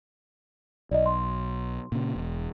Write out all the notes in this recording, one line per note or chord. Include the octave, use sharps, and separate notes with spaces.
B1 D5 D#5
C6
A#2 C#3
E1